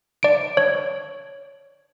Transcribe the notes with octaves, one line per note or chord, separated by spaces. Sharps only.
D5 D7
C#5